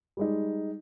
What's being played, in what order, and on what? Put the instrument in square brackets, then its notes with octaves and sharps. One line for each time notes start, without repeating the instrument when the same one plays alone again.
[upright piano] G3 G#3 D#4